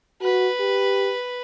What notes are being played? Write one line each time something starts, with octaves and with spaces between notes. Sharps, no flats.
F#4 B4
G4